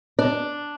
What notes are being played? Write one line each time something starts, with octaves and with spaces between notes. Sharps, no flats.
D4